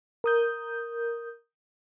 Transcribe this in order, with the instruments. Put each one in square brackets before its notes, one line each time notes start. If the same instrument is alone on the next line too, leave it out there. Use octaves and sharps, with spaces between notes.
[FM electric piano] A#4 D#6 G6